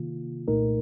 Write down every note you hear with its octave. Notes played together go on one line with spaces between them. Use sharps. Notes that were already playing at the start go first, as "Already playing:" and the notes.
Already playing: C3 D#3 A#3 F4
C2 A#2 A3 D#4 A#4